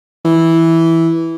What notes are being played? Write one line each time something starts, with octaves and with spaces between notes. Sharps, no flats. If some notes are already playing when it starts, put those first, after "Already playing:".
E3